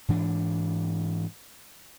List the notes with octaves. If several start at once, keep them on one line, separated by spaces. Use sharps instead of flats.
G#2 E3 D4